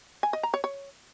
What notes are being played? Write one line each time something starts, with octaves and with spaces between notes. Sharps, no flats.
G#5
D#5
A#5
C#5
C#5